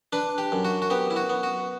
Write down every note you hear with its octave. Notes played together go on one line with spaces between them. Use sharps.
D4 B4
G4
F#2
F#4
F#4
B3 G4
E4
F#4
B3
F#4